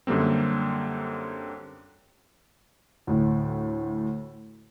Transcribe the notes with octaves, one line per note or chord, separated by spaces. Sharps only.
F#2 D3 G3 A#3 C4
D2 A2